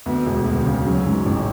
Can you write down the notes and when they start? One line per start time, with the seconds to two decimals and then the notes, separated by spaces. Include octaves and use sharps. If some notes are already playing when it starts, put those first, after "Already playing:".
0.06 D2 B3
0.26 E1
0.46 D2
0.65 C#3
0.86 F#3 C#4
1.06 G#2
1.26 A1